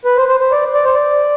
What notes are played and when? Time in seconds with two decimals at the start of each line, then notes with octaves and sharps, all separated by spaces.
0.05 B4
0.17 C5
0.28 C5
0.40 C5
0.52 D5
0.74 D5
0.85 C5
0.95 D5